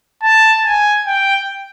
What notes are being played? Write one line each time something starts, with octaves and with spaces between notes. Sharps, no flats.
A5
G#5
G5